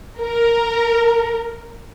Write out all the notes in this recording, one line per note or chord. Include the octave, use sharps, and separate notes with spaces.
A#4